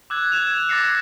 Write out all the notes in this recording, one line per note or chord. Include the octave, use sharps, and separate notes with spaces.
D6 E6 F#6 G#6
G#6 E7 F7
D6 A6 A#6 C7 C#7